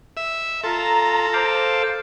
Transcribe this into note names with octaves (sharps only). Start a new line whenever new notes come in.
E5
F4 A4 A#5
C5 F5 D6